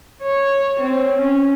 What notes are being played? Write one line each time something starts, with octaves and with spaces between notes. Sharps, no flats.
C#5
C4
C#4